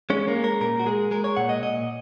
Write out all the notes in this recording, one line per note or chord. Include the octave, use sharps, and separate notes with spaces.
G#3 C#4
A#3
G#3
A#4
A#2 A#4
F#4
G#3 G#4
G#3 A#4
C#5
A#2 F#5
D#5
A#2 D#5